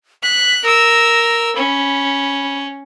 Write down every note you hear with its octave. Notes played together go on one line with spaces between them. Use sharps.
F#6 B6
A#4 E6 A#6
C#4 B5